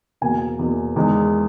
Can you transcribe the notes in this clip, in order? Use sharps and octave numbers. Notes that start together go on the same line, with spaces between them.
E2 B2 A#3 G#5
E2 B2 A#3
E2 D#3 G#3